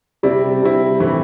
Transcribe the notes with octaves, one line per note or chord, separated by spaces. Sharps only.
C3 G3 C4 E4 D5
C3 G3 C4 E4
A2 E3 A3 C4 E4